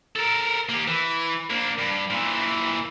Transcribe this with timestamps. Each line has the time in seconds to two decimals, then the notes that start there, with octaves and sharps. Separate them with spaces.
0.16 A4 A#4
0.69 A#3 G4
0.88 E3
1.50 A#3 D4
1.78 G2
2.10 A#2 E3